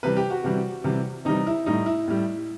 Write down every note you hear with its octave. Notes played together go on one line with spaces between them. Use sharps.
C3 E3 G3 B4
G4
F#4
C3 E3 G3
C3 E3 G3
C3 E3 G3 D#4
E4
A2 G3 D#4
E4
A2 G3